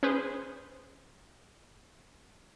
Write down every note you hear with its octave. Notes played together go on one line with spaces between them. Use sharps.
C#4 G#4 B4 C5